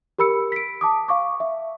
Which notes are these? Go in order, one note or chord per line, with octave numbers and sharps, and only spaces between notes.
G4 A#4 B5 E6 C#7
B6 D7
A5 D6 D#6
F5 C#6 D6
E5